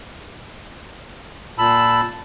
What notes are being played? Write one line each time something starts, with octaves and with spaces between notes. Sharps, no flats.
A#2 A5 B5 E6